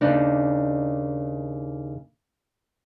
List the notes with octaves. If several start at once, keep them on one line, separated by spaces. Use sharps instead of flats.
D#2 C#3 D4 D#4